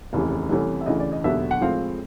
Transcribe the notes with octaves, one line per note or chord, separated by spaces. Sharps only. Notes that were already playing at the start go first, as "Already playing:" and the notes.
F1 D#2 C#3 E3
C2 C3 E3 A3 C#4
E5
D2 C#3 E3 D#5
D5
D#5
E1 D#2 D3 F#3 B3 E5
F#5
A2 F3 G#3 C4 F5